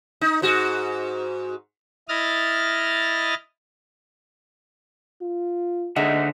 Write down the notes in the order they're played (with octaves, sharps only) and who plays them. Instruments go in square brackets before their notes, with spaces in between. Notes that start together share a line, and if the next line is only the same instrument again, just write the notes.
[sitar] D#4
G#2 F#4
[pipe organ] E4 D#5 D#6 F6 A6
[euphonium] F4
[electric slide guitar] D3 E5 F#5 [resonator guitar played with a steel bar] G#3 D#4